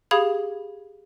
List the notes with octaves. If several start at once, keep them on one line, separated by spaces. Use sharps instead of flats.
G4 G#4 F5 B5 D#6 G#6